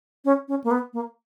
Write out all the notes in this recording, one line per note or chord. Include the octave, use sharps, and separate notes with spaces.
C#4
C#4
A#3
B3
A#3